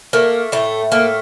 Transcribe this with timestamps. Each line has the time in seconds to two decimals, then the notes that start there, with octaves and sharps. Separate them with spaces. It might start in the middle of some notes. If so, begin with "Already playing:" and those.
0.13 A3 A#3
0.52 A2 A3
0.92 A3 A#3